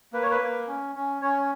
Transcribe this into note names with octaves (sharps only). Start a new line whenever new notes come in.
A#3 B4
C#5
B4
A#3
C#4
C#4
C#4 C#5